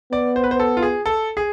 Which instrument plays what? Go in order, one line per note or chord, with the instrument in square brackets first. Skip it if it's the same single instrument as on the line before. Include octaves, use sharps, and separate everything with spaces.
[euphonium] B3 [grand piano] D5
[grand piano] C5
B4
C5
A4
F4
G#4
A4
G#4